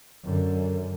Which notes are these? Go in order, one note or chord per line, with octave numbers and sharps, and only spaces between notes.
F#2 D3